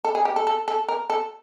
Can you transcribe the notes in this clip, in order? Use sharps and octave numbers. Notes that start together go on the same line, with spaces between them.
A4
G#4
G4
A4
A4
A4
A#4
A4